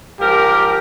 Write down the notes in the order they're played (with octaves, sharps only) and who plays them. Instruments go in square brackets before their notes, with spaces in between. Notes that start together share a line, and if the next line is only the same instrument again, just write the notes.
[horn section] G#2 F3 A#4 [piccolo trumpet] G4